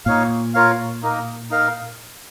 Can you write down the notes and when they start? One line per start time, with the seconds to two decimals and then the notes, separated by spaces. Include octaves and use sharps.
0.05 A#2 D#4 C#5 F5
0.54 F4 A#4 C#5 F5
1.03 A#3 D#4 A#4
1.50 D#4 A#4 F5